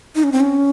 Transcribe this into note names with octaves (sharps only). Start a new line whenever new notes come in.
D#4
C#4
C4
C#4